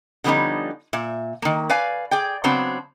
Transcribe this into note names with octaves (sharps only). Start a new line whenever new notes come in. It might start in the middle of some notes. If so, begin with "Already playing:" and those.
D3 F3 G3 B3 C#4 D#4
A#2 E5
D#3 A#3
B4 D5 F5 G#5
G#4 D5 G5
C#3 F#3 B3 C4 D4